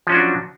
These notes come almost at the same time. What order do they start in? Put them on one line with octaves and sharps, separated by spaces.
F3 C#4 F#4 D4 F#3